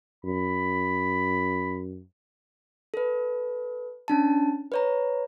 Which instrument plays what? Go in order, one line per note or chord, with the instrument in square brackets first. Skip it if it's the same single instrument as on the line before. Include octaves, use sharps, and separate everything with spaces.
[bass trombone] F#2 [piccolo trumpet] B5
[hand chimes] A4 B4
C#4 D4 A5
B4 C#5 A#5